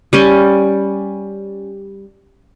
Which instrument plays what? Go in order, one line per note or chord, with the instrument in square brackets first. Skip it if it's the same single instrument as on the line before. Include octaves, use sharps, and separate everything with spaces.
[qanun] G3 C#4